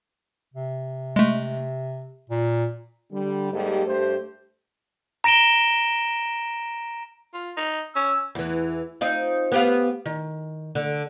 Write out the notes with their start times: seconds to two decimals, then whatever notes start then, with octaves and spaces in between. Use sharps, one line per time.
0.54 C3
1.16 G#3 A3
2.30 A#2
3.12 D3 G3
3.52 G#2 G3 A#3 D#4 G4 A4
3.86 G2 A3 G4 C5
5.24 A#5 A#6 D7 E7 G7
7.34 F4
7.57 D#4
7.96 C#4 E6
8.35 E2 E3
9.01 C4 D#4 F4
9.52 B3 G4 F5
10.05 D#3
10.75 D3